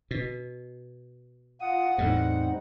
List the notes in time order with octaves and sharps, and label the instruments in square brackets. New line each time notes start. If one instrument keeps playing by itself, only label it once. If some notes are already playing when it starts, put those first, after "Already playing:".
[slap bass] B2
[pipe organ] F4 D#6 [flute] F#5
[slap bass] E2 A2 [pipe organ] G3 C4 D#4